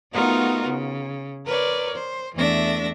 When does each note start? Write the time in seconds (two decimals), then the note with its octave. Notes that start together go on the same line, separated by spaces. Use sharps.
0.13 A3 B3 D#4 F4 F#4 A#4
0.68 C#3
1.46 A#4 B4 C#5 D5
1.95 C5
2.34 E2 E3 A3 D4 E5 A#6